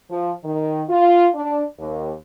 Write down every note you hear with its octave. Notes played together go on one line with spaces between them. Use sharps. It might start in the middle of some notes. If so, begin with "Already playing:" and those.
F3
D#3
F4
D4
D#2